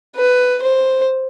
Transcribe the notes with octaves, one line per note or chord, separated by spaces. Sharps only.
B4
C5